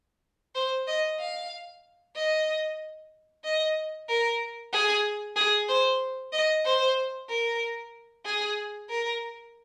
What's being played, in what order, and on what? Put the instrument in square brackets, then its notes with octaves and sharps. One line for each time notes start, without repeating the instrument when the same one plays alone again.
[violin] C5
D#5
F5
D#5
D#5
A#4
G#4
G#4
C5
D#5
C5
A#4
G#4
A#4